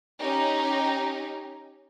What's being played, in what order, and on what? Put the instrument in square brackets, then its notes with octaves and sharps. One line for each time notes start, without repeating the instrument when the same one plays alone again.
[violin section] C#4 D#4 G4